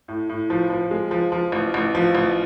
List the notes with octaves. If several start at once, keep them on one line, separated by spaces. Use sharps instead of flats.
A2
A2
F3
F3
G#3
F3
F3
A1
A1
F3
A1